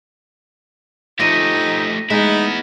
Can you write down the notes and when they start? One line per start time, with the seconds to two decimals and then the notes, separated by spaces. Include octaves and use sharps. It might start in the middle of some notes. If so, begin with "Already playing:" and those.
1.20 F3 A3 D#4 G4 A#6 D#7
2.10 G#3 B3 D#4 E4